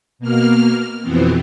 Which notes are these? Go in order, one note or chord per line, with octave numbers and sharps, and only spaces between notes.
B2 A#3 F6
F2 B2 E3 B3 C4